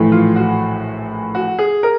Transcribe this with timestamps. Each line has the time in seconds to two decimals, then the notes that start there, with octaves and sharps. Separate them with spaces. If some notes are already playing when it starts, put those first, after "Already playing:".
Already playing: A#1 A2 E3 A3
0.12 F4
0.36 F#4
1.35 F#4
1.59 G#4
1.83 A#4